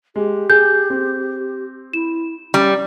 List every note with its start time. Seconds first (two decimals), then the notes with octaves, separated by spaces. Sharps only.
0.16 G#3 G4
0.50 G#4 G6
0.90 C4
1.93 E4 E7
2.54 G3 C#4